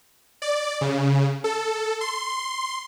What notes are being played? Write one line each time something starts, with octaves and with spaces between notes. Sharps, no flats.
D5
C#3
A4
C6